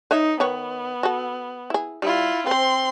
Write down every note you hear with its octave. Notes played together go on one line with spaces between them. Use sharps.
D#4 B4 C#5 E5
D#3 B3 B4 C#5
F#4 A4
E4 G#4
G3 E4 F4
C4 B4 C5 C6